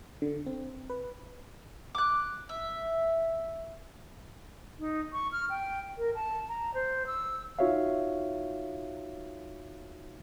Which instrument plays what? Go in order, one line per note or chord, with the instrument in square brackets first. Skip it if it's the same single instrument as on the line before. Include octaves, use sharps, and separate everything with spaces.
[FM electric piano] D3
C4
B4
[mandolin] D6 F#6
E5
[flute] D#4
C#6
F6
G5
A#4
A5
A#5
C5
E6
[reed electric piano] D#4 F4 F#4 C#5 E5 F5